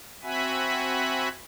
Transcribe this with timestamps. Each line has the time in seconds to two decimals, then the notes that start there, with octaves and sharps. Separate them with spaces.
0.23 C4 F#4 E5 F#5 G#5 B5